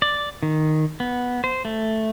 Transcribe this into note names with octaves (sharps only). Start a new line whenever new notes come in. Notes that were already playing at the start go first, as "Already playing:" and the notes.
D5
D#3
B3
C5
A3